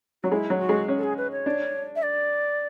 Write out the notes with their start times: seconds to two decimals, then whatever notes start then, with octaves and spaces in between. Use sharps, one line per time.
0.23 F#3 F#4
0.31 G#3 E4
0.50 F#3
0.59 F#4
0.69 G#3
0.88 C#4
0.98 A4
1.03 G#4
1.17 B4
1.32 C#5
1.46 D4
1.96 E5
2.03 D5